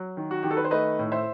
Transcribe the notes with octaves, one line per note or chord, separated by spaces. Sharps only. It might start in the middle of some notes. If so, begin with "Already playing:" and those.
Already playing: F#3
D#3
F#4
D#3 G4
A4
B4
C5
A3 B4 D#5
A2
C5 E5